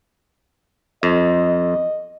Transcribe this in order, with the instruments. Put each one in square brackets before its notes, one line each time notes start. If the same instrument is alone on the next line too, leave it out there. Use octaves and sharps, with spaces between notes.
[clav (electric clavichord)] F2 [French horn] D#5